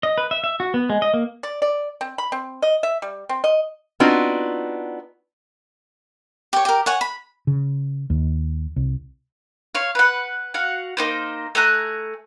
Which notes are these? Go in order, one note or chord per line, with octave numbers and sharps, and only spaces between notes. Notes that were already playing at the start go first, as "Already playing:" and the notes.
D#5
B4
E5
E5
F#4
B3
G#3
D#5
A#3
D5
D5
C4
B5
C4
D#5
E5
G3
C4
D#5
B3 C4 D4 D#4 F4 F#4
G4 C#5
G4 A#4
C#5 F#5 G#5
B5
C#3
D#2
C2
C#5 F5
B4 F#5
F#4 F5 F#5
A#3 D#4 C5
A3 G#5 A#5 F#6